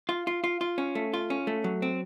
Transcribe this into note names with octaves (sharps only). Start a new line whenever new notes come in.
F4
F4
F4
F4
C#4
A3
F4
C#4
A3
F#3
C4